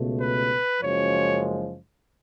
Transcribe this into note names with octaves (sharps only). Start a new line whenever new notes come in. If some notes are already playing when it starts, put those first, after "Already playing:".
Already playing: C#2 B2 A3
B4
F#1 F#2 F3 G#3 C#5